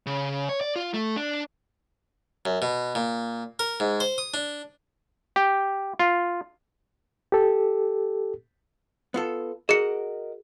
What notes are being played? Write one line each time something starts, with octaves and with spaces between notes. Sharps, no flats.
C#3
C#5
D5
F4
A3
D4
F#2
B2
A#2
A#4
G#2
C5
D#6
D4
G4
F4
G4 A4
B3 F4 A4
F#4 G#4 A#4 D#5 C#7